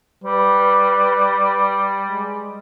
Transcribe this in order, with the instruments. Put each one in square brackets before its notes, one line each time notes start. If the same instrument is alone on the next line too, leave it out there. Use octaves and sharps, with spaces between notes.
[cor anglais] G3 [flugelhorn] B4
[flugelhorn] G#3